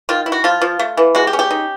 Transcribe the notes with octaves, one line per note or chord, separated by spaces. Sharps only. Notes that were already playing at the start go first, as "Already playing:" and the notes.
D#3 F4
E4
F#4
F3 F4
F3
A3
E3
G#3 F#4
G4
C#4
G4
D#4